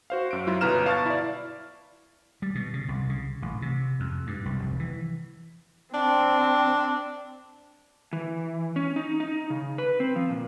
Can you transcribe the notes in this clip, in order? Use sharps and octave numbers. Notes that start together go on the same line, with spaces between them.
F#4 C5 F5
F#2 D7
F#3 E4 F4
G1 B2 B4 A#5 F6 E7
F5 A5 C#6 F6 A6
E4 D5
G3
B2
C#3
C2
C#3
A1
C3
F2
G2
C2
F1
E3
C4 D4
E3
C#4
D#4
D#4
C#3
B4
C4
F3
A#2